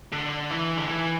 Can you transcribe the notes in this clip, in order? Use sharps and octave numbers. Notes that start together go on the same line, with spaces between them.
D3
E3
D3
E3